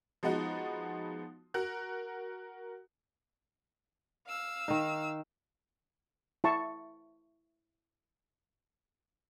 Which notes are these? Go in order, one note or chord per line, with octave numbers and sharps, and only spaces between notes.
F3 G#3 B3 D#4 F#4
F#4 A#4 F#6
F5 E6
D#3 D#4
E4 A5 C#6